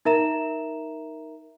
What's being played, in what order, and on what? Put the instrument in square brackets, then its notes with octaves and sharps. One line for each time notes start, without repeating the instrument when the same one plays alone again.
[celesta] D#4 A#4 E5 A#5 E7